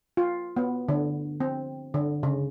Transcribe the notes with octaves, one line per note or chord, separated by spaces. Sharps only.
F4
B3
D3
C4
D3
C#3